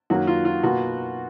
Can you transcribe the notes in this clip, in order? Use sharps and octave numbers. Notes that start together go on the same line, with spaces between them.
F#2 D#3 F#3 A#3 F#4
F4
F4
B2 A#3 F4 F#4